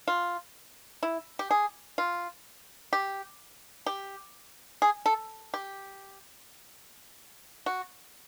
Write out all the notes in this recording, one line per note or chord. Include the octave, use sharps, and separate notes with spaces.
F4
E4
G4
G#4
F4
G4
G4
G#4
A4
G4
F#4